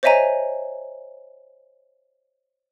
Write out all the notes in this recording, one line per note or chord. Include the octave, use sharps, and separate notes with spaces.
C5 C#5 D#5 E5 G#5 A#5